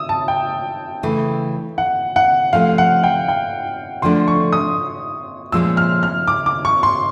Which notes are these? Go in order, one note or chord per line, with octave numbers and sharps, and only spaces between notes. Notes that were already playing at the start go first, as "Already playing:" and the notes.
Already playing: D#6 E6
A5
G5
C#3 E3 A3
F#5
F#5
C3 F3 A3 C#4 F5
F#5
G5
G5
D3 F3 A3 D4 C6
C#6
D#6
A#2 F3 G#3 C#4 E6
F6
F6
D6
D6
C#6
C6